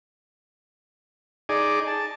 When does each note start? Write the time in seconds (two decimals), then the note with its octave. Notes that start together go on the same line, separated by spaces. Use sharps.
1.49 D#4 G#4 D5
1.88 A5